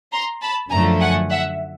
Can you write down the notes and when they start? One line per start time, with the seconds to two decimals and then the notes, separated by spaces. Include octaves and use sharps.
0.13 A#5 C6
0.42 A5 B5
0.71 F#2 D3 F3 A3 G#5 A#5
1.01 F#5 G#5
1.31 E5 F#5